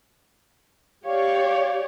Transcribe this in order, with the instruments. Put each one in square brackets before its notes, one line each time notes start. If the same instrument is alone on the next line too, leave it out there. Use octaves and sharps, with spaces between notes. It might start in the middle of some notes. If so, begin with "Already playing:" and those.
[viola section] G4 C#5 D5 [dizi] F5